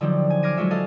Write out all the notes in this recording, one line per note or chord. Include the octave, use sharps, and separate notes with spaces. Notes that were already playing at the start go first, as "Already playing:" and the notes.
D3 F3 F#3 C4 D4 D#4
G#5
D6 F6 G#6 A#6 C7 D#7
F#3 G#3 F4 C#5 E5
A4 D#5 F5 A5